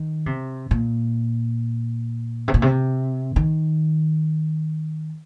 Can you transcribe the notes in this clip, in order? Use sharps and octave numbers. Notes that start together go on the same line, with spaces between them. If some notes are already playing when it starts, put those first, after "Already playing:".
Already playing: D#3
C3
A#2
C3
A#2
C3
D#3